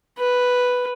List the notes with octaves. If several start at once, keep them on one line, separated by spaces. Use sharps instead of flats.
B4